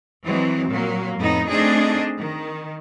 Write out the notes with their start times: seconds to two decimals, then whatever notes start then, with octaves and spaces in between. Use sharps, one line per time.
0.24 E3 F#3 G#3 C4
0.70 A#2 F#3 A#3
1.18 F2 A2 A3 B3 D#4
1.49 A3 C4 D4 D#4 G#4 D#5
2.18 D#3